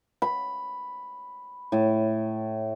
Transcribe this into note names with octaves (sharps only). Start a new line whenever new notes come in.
B5
A2